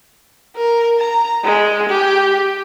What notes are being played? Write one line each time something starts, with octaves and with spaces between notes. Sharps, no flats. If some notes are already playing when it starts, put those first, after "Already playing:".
A#4
A#5
G#3
G4